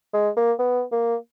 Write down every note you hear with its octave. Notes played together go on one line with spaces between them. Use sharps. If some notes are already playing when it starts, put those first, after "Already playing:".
G#3
A#3
B3
A#3